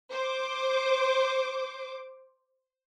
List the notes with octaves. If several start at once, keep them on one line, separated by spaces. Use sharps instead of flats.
C5 D6